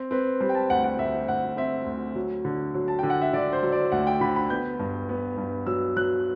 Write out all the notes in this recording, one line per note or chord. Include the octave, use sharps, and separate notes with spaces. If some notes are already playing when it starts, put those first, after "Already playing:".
Already playing: C4
C4 B4
G3 C5
G5
A5
D2 F#5
F#5
D2 E5
D2 F#5
C4 E5
D2
F#3
D3
F#3
A5
D3 G5
F#5
E5
D3 D5
C5
F#3
D5
D2 F#5
G5
D3 B5
B5
B3 G6
G2
B3
G2
F#3 E6
F#3 F#6